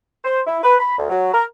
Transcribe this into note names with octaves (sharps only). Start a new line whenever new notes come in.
C5
E4
B4
B5
D2
F#3
A#4